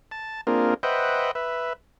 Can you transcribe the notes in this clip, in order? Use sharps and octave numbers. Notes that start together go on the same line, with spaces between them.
A5
A#3 C4 D4 F4 G#4 A#4
B4 C5 D#5 E5 F#5 G5
B4 E5